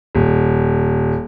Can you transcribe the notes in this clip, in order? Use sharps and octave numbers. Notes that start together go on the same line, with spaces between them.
D#1